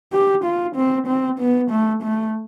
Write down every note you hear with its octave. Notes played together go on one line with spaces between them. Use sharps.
G4
F4
C4
C4
B3
A3
A3